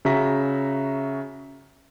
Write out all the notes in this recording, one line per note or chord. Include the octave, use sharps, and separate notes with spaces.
C#3 F#4 E5 A#5 B6